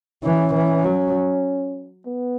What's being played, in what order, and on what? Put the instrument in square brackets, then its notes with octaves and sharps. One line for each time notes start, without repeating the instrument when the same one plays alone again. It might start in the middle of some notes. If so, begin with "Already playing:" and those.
[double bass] E3 [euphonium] C#4
[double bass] E3
F#3
[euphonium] B3